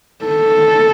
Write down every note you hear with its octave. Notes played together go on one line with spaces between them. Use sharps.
A4